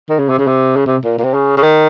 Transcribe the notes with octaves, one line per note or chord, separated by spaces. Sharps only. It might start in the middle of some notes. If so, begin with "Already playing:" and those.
D#3
C#3
C3
C#3
C3
C#3
C3
A#2
A#2
C3
C#3
C#3
D#3